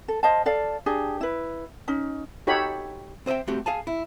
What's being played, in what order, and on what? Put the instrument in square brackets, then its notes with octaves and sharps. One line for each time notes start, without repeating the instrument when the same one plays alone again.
[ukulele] A4
C5 D#5 F5 A5
A4 D5 F5
D4 G4 G#4
E4 B4
C#4 D#4
[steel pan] D#4 F#4 G4 A4 C#5 B5
[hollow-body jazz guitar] C4 C5 D#5 E5 G5
A3 C4 F#4 G4
G#4 F5 G#5 A5
E4